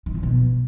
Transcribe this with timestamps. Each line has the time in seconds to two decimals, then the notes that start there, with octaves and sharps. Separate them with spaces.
0.06 D#3
0.15 F3
0.23 B2